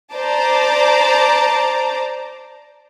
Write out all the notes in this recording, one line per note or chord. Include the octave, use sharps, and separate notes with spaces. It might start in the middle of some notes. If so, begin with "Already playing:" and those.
C5 D5 A5 A#5 D6